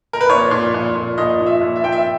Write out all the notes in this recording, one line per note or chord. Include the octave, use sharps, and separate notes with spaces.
A#4
B4
A#2 C#5
A#2
A#2
A#2
A#2 D#5
A#2
E5
A#2
E5
A#2 G5
E5